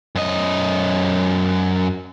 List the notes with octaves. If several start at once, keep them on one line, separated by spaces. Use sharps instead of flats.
F#2 D#5